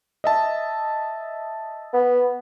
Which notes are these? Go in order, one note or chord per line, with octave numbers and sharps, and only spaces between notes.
D#5 E5 A5
B3